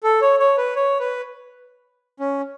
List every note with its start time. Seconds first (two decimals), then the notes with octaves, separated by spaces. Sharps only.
0.04 A4
0.22 C#5
0.39 C#5
0.58 B4
0.76 C#5
1.00 B4
2.20 C#4